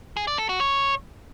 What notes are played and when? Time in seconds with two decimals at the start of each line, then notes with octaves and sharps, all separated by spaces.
0.17 G#4
0.27 D5
0.38 A4
0.49 F#4
0.60 C#5